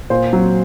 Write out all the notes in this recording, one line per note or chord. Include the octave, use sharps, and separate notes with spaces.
A#2 C5
F#3 C4